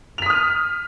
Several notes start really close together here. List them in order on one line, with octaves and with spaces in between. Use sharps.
F7 B6 D#6 F6